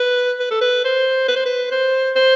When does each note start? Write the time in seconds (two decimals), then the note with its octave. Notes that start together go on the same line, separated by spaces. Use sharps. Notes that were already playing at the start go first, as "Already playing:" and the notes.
Already playing: B4
0.39 B4
0.51 A4
0.61 B4
0.84 C5
1.28 B4
1.36 C5
1.45 B4
1.71 C5
2.16 C5